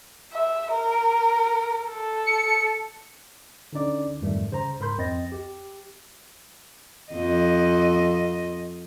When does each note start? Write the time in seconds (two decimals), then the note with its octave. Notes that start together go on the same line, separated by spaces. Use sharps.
0.33 E5
0.72 A#4
1.89 A4
2.26 C#7
3.73 D3 C#4 D#4 D5 D6
4.21 F2 G#2 D#3 G3 A3
4.51 C#3 C5 A#5
4.80 G#2 A#4 B5 C6 G6
4.98 F2 C4 D#5 A6 A#6
5.32 G4
7.13 F2 D#5